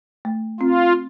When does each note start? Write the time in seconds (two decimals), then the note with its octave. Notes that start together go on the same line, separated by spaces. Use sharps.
0.25 A3
0.60 C4 F4